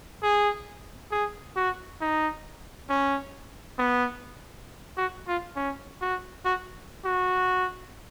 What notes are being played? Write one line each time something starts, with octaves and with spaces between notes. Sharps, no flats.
G#4
G#4
F#4
D#4
C#4
B3
F#4
F4
C#4
F#4
F#4
F#4